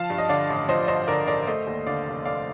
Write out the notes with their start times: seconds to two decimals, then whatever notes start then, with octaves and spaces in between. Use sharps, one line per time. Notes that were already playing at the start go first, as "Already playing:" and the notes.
Already playing: F3 F5 A5
0.10 G2
0.18 D#5
0.29 D3 D5 F5
0.49 A1
0.69 F3 C5 D#5
0.88 G2 C5 D#5
1.08 D3 A#4 D5
1.27 A1 A#4 D5
1.47 A3 C5 D#5
1.67 D#2
1.86 D3 D5 F5
2.06 F1
2.25 A3 D5 F5